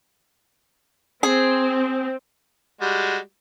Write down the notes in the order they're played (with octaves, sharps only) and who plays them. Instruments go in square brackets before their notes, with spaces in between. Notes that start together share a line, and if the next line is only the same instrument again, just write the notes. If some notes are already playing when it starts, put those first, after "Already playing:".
[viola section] C4 [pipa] G#4
[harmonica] G3 G#3 F#4